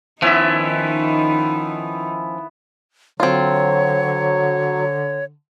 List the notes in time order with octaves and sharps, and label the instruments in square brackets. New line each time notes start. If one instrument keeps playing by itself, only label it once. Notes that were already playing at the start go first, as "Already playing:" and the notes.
[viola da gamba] D#3 D#4 [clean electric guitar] F3 C#4 E5 [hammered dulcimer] B3 E4
[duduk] D3 [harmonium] F#3 [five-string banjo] C4 F4 [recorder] C#5